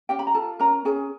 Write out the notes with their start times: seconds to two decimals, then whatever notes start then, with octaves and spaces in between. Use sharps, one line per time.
0.09 C#4 G4 G5
0.19 B5
0.27 A#5
0.34 F4 A4 A5
0.59 C#4 A#4 A#5
0.85 C#4 G#4 G#5